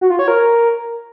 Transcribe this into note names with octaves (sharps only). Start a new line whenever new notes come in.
F#4
F4
C#5
A#4